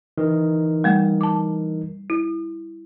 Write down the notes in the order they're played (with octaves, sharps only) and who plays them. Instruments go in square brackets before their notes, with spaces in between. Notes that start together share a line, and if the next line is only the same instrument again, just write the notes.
[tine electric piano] E3 D#4 A#4
[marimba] G3 A3 F#5
A5 D6
E4